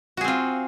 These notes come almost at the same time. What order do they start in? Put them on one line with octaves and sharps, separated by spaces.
F#4 G#4 C4 F4